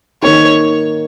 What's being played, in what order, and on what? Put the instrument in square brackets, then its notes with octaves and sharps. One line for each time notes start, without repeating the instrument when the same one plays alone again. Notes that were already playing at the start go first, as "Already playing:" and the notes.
[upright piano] D#3 A#3 D#4 [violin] C#5